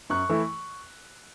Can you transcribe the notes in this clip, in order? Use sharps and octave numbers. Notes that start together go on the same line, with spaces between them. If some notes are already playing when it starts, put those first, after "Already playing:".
F#2 C#6 F#6
E3 A3 E4